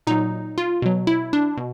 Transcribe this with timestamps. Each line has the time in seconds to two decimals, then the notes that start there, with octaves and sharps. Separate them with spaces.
0.07 A#2 F#3 D#4
0.58 F4
0.82 B2 F#3
1.07 E4
1.33 D4
1.57 B2